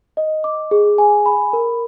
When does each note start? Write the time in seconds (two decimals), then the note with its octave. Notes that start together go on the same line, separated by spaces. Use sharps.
0.17 D#5
0.44 D6
0.71 G#4
0.98 G#5
1.26 B5
1.53 A#4